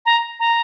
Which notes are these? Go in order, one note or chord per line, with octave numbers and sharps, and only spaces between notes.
A#5
A#5